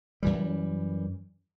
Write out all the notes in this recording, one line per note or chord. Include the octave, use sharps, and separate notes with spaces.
F#2 E3 G3